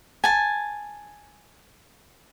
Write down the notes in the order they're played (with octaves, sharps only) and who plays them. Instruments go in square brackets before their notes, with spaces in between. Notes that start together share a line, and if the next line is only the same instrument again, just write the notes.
[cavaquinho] G#5 A5